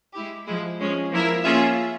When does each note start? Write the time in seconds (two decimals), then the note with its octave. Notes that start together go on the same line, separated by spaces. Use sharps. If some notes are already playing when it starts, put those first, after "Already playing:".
0.14 G#3 E4 G4
0.46 F3 G#3 E4
0.79 F3 G#3 C#4
1.12 F3 A#3 E4 A#4 E5
1.45 A#3 C#4 F4 G#4 E5